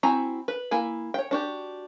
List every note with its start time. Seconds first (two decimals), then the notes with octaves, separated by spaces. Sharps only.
0.03 C4 E4 F#4 G#5 A#5
0.48 B4
0.71 A#3 E4 G#5
1.14 C#5 G5
1.31 D4 F#4 G4